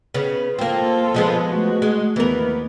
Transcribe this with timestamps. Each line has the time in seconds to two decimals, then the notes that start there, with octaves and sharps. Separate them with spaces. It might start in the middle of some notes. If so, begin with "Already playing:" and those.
0.14 C#3 B3
0.59 A#3 C4 F4 A4
1.14 F3 G#3 B3
1.47 A3 F#4
1.82 G#3
2.16 D#2 E3 B3 A#4